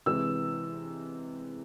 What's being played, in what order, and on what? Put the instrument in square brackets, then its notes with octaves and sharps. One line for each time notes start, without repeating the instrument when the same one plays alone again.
[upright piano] C3 E3 G#3 E6